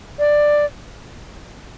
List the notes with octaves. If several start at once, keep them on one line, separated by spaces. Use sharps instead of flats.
D5